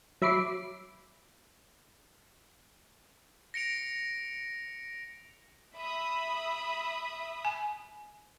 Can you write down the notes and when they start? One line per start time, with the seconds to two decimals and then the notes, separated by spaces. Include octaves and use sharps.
0.22 F#3 E5 B5 D6 C7
3.54 A#6 C#7 D7 F7
5.76 E5 B5 D#6
7.45 G#5